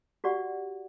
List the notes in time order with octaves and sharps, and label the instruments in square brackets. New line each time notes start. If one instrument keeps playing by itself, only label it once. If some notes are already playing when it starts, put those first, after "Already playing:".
[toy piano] F#4 G4 D5 F#5